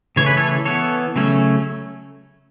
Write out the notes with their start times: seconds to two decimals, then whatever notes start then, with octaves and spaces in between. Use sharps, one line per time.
0.16 C#3 E3 A3 C#4 C#5
0.26 B4
0.37 A4 C#5
0.65 E3 B3 A4 C#5
1.16 C#3 F#3 A3 C#4